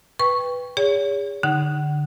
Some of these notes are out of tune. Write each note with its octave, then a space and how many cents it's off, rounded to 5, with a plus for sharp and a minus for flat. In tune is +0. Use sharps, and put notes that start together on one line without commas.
B4 +0 G5 +20 C#6 +0
G#4 -35 C#5 +35
D3 +0 D#4 +0 F#5 +30